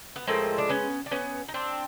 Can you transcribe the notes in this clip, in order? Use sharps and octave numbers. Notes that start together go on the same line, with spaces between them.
B3
A2 F3 G#3 A#3 C4
D4
B3 C#4
D4
B3 C#4
D#4
C4 D4